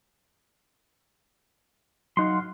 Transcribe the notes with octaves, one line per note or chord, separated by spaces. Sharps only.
F#3 D#4 F5 F#5 C6